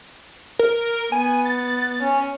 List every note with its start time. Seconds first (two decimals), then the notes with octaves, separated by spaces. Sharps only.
0.59 A#4
1.12 B3 G#5
1.45 A6
2.02 C#4